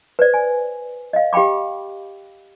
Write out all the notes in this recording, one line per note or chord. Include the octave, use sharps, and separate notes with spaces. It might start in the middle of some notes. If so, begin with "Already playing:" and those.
B4 C5 D5
G#5
D#5 F5
G4 F5 G5 B5 D6